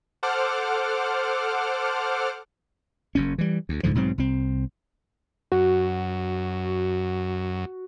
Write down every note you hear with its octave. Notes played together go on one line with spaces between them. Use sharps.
A4 C5 F#5 D6 F6
F#1 F#2 C#4
E3 G3
D2
C#2 G#2 D3 F3
B1 G#2 F#3 C4
C2 C4
F#2 F#4